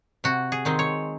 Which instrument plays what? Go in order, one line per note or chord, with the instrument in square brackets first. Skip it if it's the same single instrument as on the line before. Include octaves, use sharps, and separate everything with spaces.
[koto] C3 F#4
G#4
D#3 G#3 C4 D#4
C#5